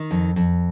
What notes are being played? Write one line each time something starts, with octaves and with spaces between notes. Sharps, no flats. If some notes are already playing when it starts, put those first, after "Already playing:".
Already playing: D#3
F2
F2